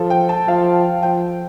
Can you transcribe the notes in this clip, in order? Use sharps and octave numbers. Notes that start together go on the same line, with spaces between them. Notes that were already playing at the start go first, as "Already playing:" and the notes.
Already playing: F3 A4
G5
A5
F3 F5
F3 G5